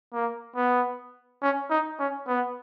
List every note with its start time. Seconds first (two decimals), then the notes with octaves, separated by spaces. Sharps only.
0.14 A#3
0.56 B3
1.42 C#4
1.70 D#4
2.00 C#4
2.28 B3